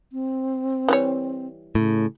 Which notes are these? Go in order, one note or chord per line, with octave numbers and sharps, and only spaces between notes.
C4
E3 G3 C#5
A2 C#3